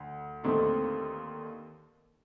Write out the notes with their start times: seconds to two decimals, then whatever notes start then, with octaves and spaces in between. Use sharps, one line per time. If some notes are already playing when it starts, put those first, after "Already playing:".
Already playing: D2
0.43 D#2 D3 A3 C4 D#4